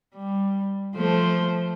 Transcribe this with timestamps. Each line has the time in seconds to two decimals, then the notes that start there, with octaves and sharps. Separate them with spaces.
0.15 G3
0.95 F3 A3 C5